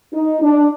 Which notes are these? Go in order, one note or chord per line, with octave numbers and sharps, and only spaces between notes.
D#4
D4